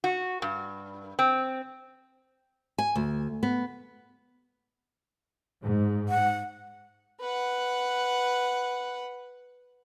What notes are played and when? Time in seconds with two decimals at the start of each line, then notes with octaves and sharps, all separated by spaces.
0.04 F#4
0.42 G2
1.19 C4
2.78 G#5
2.96 D2
3.43 B3
5.63 G#2
6.09 F#5
7.21 B4 F#5